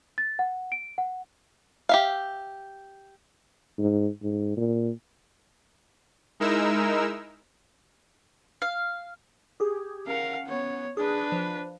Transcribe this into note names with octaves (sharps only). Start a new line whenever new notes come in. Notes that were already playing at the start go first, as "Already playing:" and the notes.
A6
F#5
D7
F#5
G4 E5 F5
G#2
G#2
A#2
G#3 D#4 E4 A#4 E6
F5
G4 G#4
C#4 A#4 F5 F#5
B3 C#5
D4 G#4 B4
F3